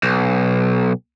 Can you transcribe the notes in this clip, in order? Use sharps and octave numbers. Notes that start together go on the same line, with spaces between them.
B1